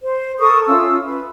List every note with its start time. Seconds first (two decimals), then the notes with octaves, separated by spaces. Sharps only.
0.01 C5
0.39 A4 A#4 C#6 D#6
0.66 C#4 E4 F4 E6
1.04 B4